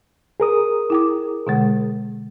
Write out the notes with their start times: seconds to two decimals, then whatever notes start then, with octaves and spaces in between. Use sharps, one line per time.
0.40 G#4 A#4 D#6
0.90 E4 G5 D6
1.47 B2 D3 G#3